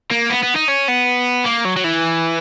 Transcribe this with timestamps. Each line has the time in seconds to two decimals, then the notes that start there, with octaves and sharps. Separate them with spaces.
0.11 A#3
0.30 B3
0.43 B3
0.56 D#4
0.69 C#4
0.88 B3
1.45 A#3
1.65 F#3
1.77 F#3
1.85 E3